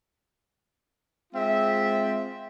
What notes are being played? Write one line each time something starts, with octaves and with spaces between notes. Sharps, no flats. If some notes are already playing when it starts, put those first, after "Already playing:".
G#3 C4 F4 E5